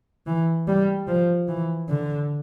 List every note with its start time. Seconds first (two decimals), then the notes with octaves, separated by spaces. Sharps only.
0.27 E3
0.67 G3
1.07 F3
1.48 E3
1.89 D3